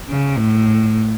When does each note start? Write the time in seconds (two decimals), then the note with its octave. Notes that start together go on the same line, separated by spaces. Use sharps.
0.09 C#3
0.38 A2